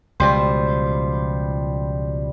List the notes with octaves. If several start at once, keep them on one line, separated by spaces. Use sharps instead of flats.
C#2 B2 F3 G3 C5